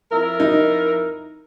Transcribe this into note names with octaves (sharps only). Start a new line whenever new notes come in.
F2 E4 A#4
D#4